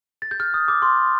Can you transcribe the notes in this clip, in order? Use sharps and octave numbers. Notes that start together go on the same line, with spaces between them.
A6
G6
F6
D#6
D6
C6